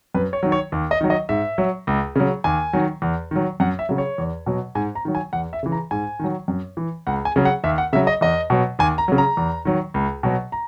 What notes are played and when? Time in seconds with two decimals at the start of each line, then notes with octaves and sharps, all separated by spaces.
0.15 F#2 B4
0.33 C#5
0.43 D#3 F#3
0.52 C#5
0.72 D#2
0.91 D#5
1.01 D#3 F#3
1.10 D#5
1.29 G#2 E5
1.58 F#3
1.87 C#2
2.16 C#3 F#3
2.44 D#2 G#5
2.73 D#3 F#3
3.02 E2
3.31 D#3 F#3
3.60 F#2 F#5
3.79 E5
3.89 C#3 F#3
3.98 C#5
4.18 E2
4.46 B2 F#3
4.75 G#2 G#5
4.95 A#5
5.05 D#3 F#3
5.15 G#5
5.33 E2 F#5
5.53 E5
5.63 C#3 E3
5.72 A#5
5.91 G#2 G#5
6.19 D#3 F#3
6.48 F#2
6.77 E3
7.07 C#2 F#5
7.25 G#5
7.36 C#3 F#3
7.45 F#5
7.64 D#2 E5
7.78 F#5
7.93 C#3 F#3 E5
8.07 D#5
8.21 E2 D#5
8.50 B2 F#3
8.79 D#2 G#5
8.98 A#5
9.08 C#3 F#3
9.18 A#5
9.37 E2
9.65 D#3 F#3
9.94 C#2
10.23 B2 F#3
10.52 A#5